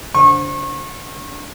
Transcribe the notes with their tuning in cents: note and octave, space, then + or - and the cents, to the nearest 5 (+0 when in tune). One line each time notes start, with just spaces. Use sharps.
D3 -20 C5 +5 C#6 -35